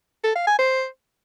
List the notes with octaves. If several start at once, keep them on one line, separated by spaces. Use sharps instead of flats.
A4
F5
G#5
C5